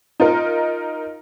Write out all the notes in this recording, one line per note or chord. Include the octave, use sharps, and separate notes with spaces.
D#4 F4 A#4